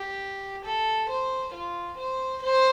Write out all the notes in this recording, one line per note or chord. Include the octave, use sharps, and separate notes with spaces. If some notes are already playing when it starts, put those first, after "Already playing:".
Already playing: G4
A4
C5
F4
C5
C5